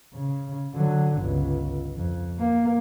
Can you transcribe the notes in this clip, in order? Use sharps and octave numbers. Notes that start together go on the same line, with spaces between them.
C#3
D3 F#3
G1 C#2
F2
A#3